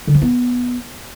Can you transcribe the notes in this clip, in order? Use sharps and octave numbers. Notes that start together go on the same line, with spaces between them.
D3
F3
B3